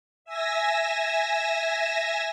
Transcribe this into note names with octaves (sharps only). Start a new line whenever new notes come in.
E5 G#5 E6 A#6